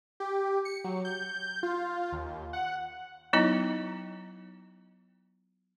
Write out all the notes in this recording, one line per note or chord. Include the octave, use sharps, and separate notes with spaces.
G4
C#7
F#3
G6
F4
D#2
F#5
F#3 B3 D#4 E4 D#5 A#5